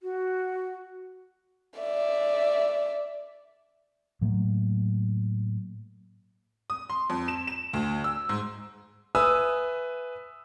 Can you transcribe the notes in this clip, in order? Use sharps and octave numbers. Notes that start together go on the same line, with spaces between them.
F#4
D5 E5
A2 F#3 A#3
D#6
C6
F2
E7
E7
D2
E6
G#2
B4 E5 G#5 D#6 E6